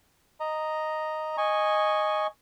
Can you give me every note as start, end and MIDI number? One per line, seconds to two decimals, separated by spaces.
0.40 1.37 75
0.40 1.37 82
1.37 2.27 75
1.37 2.27 80
1.37 2.27 85